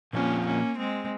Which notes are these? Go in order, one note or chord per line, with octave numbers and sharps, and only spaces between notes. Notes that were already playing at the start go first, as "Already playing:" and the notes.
A#2 F3 A#3 C4 C#4 F4
A#3 C#4
G#3 C4